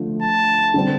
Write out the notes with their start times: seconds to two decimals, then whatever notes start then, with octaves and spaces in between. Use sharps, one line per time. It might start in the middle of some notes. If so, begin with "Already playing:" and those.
Already playing: D3 F3 A3
0.22 A5
0.74 D3 G3 C4